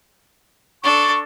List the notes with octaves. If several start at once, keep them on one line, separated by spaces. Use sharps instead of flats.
D4 A4 C#6